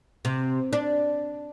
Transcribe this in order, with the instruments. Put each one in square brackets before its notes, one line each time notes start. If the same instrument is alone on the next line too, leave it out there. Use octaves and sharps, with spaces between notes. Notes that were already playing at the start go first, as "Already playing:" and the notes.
[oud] C3
D4